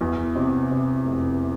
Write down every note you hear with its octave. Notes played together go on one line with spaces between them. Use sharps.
E2
C3
C3
F1